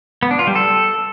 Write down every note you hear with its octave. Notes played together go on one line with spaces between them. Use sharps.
B3
D4
F4
G3
A4